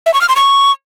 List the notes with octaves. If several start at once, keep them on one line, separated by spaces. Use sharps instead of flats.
E5
C#6
F6
C6
C#6